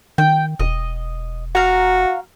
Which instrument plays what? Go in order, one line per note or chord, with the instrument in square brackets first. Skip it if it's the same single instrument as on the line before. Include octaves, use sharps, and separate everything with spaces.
[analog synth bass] D#3 [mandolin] G5
[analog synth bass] E1 [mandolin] D#5
[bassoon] F#4 [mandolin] F5 A#5